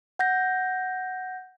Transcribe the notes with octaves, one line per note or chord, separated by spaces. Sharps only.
F#5 G6 A#6